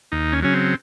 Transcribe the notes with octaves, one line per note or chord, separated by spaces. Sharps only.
D#2 D#4
C#4
C#3 F#3 C#4
C4